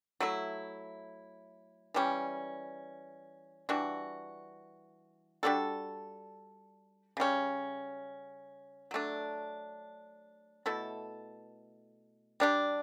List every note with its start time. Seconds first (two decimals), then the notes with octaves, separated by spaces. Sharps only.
0.20 F#3 A3 E4
1.94 E3 G3 C#4
3.69 E3 G3 D4 F#4
5.43 G3 D4 F#4 A4
7.17 C#3 G3 C#4
8.91 F#3 A3 D4
10.66 B2 A3 E4 A4
12.40 G3 D4 G4